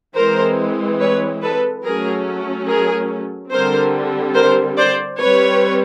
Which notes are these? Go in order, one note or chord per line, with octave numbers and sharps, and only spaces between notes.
E3 G#3 C4 A#4 C5
B4 C#5
A4 B4
F#3 A3 C#4 G#4 A#4
G#4 A#4
D3 G3 C4 A#4 C5
A#4 C5
C5 D5
G3 C4 B4 C#5